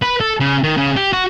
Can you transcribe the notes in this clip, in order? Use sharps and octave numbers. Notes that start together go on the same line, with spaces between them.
B4
A4
C#3
D#3
C#3
G4
F#4